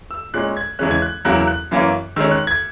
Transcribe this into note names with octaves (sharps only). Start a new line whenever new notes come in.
E6
A#2 G#3 C#4 F#6
G#6
E2 C#3 E3 G#3 C#4 F#6
G#6
F#6
E2 C#3 F#3 A#3 E4 F#6
F#6
F#2 E3 A#3 C#4
D#3 G#3 C#4 E6
F#6
G#6